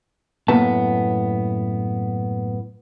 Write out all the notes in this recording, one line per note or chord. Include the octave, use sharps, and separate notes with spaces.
F#2 A2 A#3 B3 A5